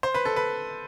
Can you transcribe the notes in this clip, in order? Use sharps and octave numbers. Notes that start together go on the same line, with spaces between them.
C5
B4
A4
B4